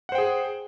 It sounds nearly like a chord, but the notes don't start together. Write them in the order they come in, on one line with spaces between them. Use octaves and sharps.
F#5 C5 G5 G#4